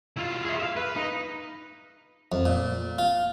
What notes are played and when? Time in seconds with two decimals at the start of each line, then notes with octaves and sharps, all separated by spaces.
0.17 E4 F4
0.44 G#4 E5
0.59 E5 F5
0.76 B4
0.96 D#4
2.32 F2
2.46 A#2
2.98 F4